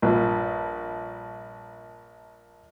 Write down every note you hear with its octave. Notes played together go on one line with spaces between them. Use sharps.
A#1 G2 A#2